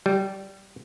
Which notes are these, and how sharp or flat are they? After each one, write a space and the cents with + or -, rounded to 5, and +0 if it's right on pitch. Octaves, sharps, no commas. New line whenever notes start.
G3 -15